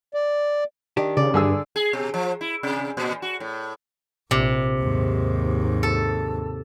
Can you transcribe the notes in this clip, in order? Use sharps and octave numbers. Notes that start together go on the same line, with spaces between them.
D5
D#3 D4 G4
C#3 D5
G2 D3 G#4 E6
G#4
B2
F3
E4
C3
A#2
F#4
A2
A#1 C3
D#2 G#2
A4